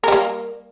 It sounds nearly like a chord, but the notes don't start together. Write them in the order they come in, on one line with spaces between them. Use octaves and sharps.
A#4 G3 A#3